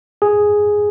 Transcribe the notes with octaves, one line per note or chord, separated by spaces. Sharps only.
G#4